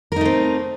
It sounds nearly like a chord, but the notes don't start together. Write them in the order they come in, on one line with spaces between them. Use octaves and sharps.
A#4 D#4 A3 C4